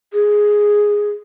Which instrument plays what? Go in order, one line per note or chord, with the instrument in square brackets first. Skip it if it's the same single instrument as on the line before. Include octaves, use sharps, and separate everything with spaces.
[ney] G#4